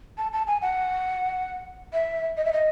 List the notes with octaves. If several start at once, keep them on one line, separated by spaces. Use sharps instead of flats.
A5
A5
G#5
F#5
E5
D#5
E5
D#5